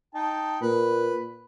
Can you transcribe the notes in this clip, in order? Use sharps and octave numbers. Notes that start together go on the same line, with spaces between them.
D#4 G5 A5
A#2 B4